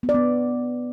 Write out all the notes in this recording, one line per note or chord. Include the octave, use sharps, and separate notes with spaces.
B3
D5
B3